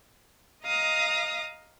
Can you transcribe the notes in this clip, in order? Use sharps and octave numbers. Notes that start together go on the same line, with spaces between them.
D#5 F5 A#5 D#6